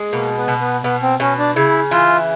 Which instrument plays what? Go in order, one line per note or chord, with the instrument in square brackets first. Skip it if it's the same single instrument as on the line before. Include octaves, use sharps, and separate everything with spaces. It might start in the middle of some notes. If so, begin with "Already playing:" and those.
Already playing: [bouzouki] G#3
[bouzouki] B2 [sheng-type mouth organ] A#3
[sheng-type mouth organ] B3
[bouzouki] B2
[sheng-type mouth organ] B3
[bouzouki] B2 [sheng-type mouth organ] B3
[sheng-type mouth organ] C4
[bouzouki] B2 [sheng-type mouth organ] C#4
[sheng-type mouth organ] D4
[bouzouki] C#3 [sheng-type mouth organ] E4
[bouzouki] E3 [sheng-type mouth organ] F4